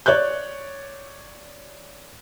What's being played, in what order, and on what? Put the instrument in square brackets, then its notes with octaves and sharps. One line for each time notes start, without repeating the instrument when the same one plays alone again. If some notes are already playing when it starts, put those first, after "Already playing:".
[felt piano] C#5 D5 F#6 G6